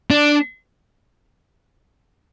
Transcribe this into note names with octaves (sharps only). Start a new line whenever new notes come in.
D4